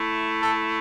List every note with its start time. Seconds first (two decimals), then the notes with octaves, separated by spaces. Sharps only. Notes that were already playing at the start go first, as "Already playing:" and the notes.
Already playing: A3 E4
0.43 A4